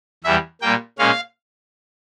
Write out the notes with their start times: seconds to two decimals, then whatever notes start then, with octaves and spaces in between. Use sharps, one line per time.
0.24 E2 E3 G3 E5
0.61 A#2 G3 A#3 G5
0.98 A#2 G#3 C#4 F5